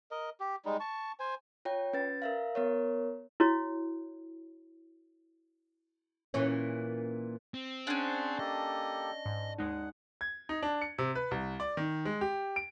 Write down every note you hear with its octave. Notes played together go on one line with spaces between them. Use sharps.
A#4 D#5
G4
G3 G#3 D#4
A5 C#6
C5 G#5
F4 C#5 G5
C#4 B4 A6
A#4 E5 F5
B3 A#4 C#5
E4 F#4 C#5
A#2 E3 C#4
C4
C#4 D4 G#4 C5 F#5
A#3 G4 A4 D#5
G#2
D#2 G#3 D#4 F#5
G#6
D#4
D4
C#7
C3
B4
C2
D5
D#3
G#3
G4
D7